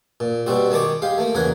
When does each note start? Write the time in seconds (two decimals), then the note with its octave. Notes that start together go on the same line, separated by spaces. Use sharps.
0.20 A#2
0.46 B2 G3 C4 F#4
0.71 D#3 G#3 A5 C#6 D6
1.02 G#3 G4 F5
1.18 A3 A#3
1.35 E2 C#3 F#3 A#4 F#5 G#5